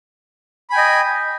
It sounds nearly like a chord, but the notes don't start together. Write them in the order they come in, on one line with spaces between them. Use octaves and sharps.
B5 G#5 G5 D#5